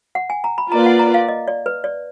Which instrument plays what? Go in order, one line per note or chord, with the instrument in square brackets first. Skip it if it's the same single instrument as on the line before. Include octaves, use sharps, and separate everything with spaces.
[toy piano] F#5
G#5
A#5
B5
[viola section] A#3 F4 B4 D5 [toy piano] A#5
[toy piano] F#5
A#5
F5
D#5
D5
B4
D5